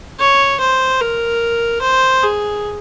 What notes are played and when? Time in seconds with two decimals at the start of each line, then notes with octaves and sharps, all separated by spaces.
0.20 C#5
0.60 C5
1.01 A#4
1.82 C5
2.23 G#4